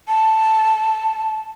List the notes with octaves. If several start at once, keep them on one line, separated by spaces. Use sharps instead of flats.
A5